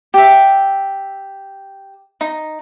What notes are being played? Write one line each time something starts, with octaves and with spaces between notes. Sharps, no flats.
G4 E5
D#4